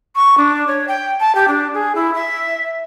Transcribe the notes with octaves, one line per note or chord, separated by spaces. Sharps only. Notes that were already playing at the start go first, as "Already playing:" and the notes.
C#6
D4
C#5
G5
A5
G4
D4
G#4
E4
E5